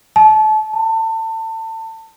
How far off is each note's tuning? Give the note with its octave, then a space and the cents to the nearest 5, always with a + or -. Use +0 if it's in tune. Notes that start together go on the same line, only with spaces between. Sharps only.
A5 -30
A5 +30